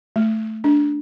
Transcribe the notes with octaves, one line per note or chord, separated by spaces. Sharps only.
A3
D4